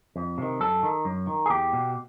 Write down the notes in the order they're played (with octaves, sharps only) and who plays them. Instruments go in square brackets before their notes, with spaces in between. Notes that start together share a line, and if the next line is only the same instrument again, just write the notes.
[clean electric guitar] F2
C3 D#3
F#2 A4
D#3
F#2
D#3
G#4
E2 G4
B2